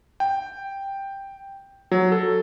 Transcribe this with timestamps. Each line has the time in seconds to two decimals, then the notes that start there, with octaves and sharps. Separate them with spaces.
0.20 G5
1.92 F#3
2.12 A4